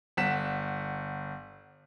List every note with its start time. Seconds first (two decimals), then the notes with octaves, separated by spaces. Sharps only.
0.17 G1 F#5 B6 E7